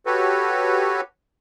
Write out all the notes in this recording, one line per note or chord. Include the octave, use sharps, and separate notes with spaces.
F#4 G4 A4 B4 C#5